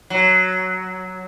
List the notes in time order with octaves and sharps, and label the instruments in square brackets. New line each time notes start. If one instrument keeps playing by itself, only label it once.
[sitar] F#3